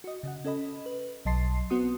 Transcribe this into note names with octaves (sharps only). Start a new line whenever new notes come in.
F#4 D#5
C#3 D#5 F#5
C#4 A4 D#5 B5
B4
B1 F#3 D#5 A5 C6 C7
B3 C4 F#4 C6 D#6